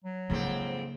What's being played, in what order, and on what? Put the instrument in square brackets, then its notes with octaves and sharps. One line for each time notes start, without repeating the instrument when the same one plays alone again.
[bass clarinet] F#3
[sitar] F2 G#2 C4 [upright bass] C#3 A#3